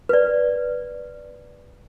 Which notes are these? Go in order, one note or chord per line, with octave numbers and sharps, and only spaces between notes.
B4 D5